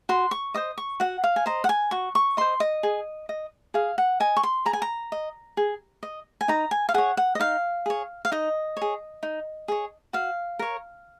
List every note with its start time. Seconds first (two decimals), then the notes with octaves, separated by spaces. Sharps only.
0.09 F#4 C6
0.31 C#6
0.54 C5 D#5 D#6
0.78 C#6
1.00 F#4 F#5
1.24 F5
1.36 G#5
1.46 C5 D#5 A#5
1.64 F#5
1.69 G#5
1.91 F#4 C#6
2.15 C#6
2.37 C5 D#5 C6
2.60 D#5
2.83 G#4
3.29 D#5
3.74 G#4 F5
3.98 F#5
4.20 D#5 G#5
4.37 C#6
4.43 C6
4.65 G#4 A#5
4.73 G#5
4.82 A#5
5.12 D#5
5.57 G#4
6.03 D#5
6.41 G#5
6.48 D#4 A#5
6.71 G#5
6.89 F5
6.94 G#4 C#5 F#5
7.17 F#5
7.35 D#5
7.40 D#4 F5
7.86 G#4 C#5
8.25 F5
8.32 D#4 D#5
8.77 G#4 C#5
9.23 D#4
9.68 G#4 C#5
10.13 F#4 F5
10.59 A#4 C#5